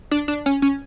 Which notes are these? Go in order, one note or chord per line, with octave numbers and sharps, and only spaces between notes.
D4
D4
C#4
C#4